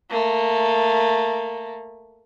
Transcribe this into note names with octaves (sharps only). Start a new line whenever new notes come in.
A3 A#3